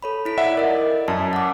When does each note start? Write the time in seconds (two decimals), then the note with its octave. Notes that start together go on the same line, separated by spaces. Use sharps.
0.03 A4 C#5 B5
0.25 E4 B6 D7
0.38 D5 E5 F#5
0.57 A#4 D5 D#5
1.08 F#2 A5 B6
1.33 F#5 D6